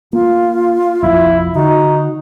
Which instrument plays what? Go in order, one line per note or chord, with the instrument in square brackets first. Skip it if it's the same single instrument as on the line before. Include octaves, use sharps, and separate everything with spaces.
[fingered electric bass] A#3 [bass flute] F4
[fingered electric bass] F1 A#1 F3 [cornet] E4
[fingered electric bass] D3 [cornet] D#4 [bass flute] F#4